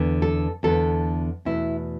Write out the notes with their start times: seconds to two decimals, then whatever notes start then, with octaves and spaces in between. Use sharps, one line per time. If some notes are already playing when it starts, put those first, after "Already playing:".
Already playing: E2 D3 B3
0.22 A4
0.63 E2 D3 B3 A4
1.45 E2 B2 A3 E4